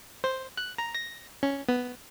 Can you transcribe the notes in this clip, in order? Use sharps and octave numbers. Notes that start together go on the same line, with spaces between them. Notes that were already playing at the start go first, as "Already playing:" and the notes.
C5
F#6
A#5
A#6
C#4
B3